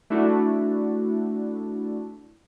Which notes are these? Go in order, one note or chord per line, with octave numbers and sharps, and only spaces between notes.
A3 D4 E4 F#4